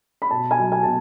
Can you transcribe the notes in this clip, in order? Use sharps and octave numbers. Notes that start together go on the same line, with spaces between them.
B5
B2 A5
G#5
F#3
G#5
B2 A5